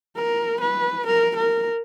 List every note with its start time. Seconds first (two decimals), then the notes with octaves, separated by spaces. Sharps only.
0.16 A#4
0.61 B4
1.06 A#4
1.36 A#4